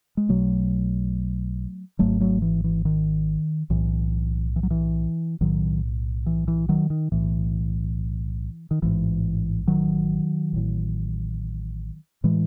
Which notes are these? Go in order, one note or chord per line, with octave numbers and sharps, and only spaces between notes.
G#3
B1 B2 F#3 A3
G#1 G#2 F#3 A3
F#3 A3
E3
E3
D#3
B1 A2 E3
E3
F#3
E3
B1 A2 D#3 F#3
E3
E3
D#3 F#3
D#3
B1 A2 E3
D#3
A1 G#2 E3
D#3 F#3
A1 A2
A2 E3 G#3